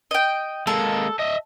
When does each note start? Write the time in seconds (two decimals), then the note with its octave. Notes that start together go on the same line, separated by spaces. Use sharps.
0.11 D#5 G5
0.67 G#3 A#3 A4
1.19 D#5 E5